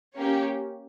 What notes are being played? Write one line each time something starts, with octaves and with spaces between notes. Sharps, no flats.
A#3 C#4 G4 C#5